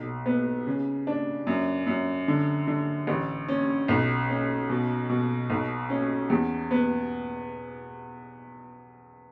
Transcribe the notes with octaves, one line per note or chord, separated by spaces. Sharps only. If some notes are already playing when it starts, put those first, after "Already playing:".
Already playing: B1
B3
C#3
D4
F#2
F#2
D3
D3
A1
C#4
B1
C#4
B2
B2
B1
C#4
E2
B3